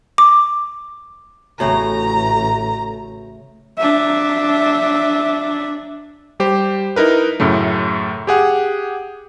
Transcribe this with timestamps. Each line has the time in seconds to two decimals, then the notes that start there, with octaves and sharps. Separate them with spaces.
0.18 D6
1.60 A1 A2 C#3 A3 F#4 C#5 A#5
3.78 D4 E5
6.40 G3 G4 C5
6.96 D#4 E4 A#4 B4
7.40 F#2 A2 C#3 A3
8.27 G4 G#4 F#5